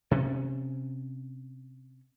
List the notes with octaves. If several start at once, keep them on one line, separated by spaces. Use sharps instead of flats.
C3 C#4